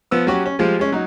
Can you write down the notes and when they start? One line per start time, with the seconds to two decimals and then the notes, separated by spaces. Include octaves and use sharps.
0.11 F3 B3 E6
0.27 F#3 C#4 F#4 G4
0.46 C#4
0.59 F3 G3 G#3 F4
0.79 G#3 C#4
0.92 F#3 D#4